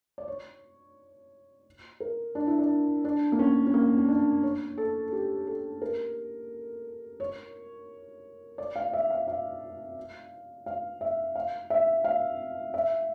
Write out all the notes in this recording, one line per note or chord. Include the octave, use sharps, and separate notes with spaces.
D5
C#5
A#4
D4
E4
D4
D4
A#3
C#4
C#4
A#3
C#4
D4
C#5
A4
A4
G4
A4
A#4
C#5
D5
F5
E5
F5
F5
F5
E5
F5
E5
F5
E5